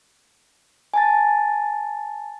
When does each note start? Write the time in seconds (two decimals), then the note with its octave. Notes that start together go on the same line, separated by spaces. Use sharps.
0.94 G#5 A5 A6